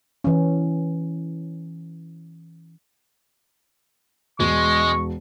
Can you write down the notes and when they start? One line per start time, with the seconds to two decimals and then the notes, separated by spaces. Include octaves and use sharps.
0.24 E3 C#4
4.40 E1 G#3 C#6